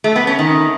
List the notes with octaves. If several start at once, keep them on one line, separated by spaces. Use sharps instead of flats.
A3
B3
C#4
D#3